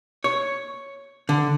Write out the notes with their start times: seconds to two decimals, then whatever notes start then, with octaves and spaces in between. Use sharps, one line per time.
0.24 C#5
1.29 D3